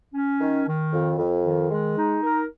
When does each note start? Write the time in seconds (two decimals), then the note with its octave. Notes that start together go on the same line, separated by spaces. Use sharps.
0.14 C#4
0.41 D#3
0.67 D#3
0.93 F2
1.19 F2
1.45 D#3
1.71 G#3
1.97 D#4
2.23 A#4